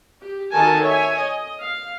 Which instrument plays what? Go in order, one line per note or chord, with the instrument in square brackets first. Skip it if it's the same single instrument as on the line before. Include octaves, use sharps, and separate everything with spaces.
[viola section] G4
D#3 F#4 A4 A#4 G#5 A5
C#5 E5 G#5
D#5
F5